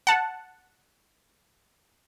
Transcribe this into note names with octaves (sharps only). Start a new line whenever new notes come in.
F#5 A5